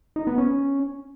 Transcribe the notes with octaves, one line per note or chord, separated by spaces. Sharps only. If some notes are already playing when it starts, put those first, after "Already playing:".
D#4
B3
C#4